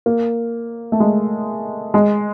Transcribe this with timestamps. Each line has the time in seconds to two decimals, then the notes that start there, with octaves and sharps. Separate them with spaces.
0.06 A#3
0.92 A3
1.00 G#3
1.94 G#3